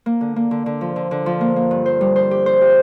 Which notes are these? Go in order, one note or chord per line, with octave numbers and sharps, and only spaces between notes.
A#3
D3
A#3
D3
D3
F3
D3
D3
F3
A#3
A#3
G2
C5
G3
C5
G4
C5
G4